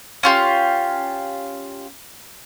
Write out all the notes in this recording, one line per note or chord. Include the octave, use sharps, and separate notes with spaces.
C#4 F4 G4